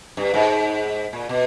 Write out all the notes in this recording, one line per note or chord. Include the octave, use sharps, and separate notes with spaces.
G2
G#2
A#2
B2